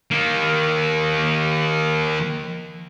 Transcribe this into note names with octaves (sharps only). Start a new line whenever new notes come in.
D#3 A#3